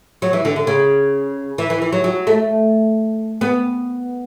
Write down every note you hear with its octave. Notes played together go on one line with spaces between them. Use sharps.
F#3
E3
D3
D3
C#3
E3
E3
E3
F#3
F#3
A3
B3